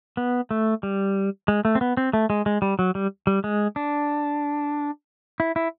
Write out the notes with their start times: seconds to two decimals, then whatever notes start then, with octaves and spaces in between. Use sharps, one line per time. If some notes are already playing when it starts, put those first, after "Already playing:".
0.17 B3
0.51 A3
0.83 G3
1.48 G#3
1.65 A3
1.75 C4
1.81 B3
1.97 C4
2.13 A3
2.30 G#3
2.46 G#3
2.62 G3
2.79 F#3
2.95 G3
3.27 G3
3.44 G#3
3.76 D4
5.40 E4
5.56 E4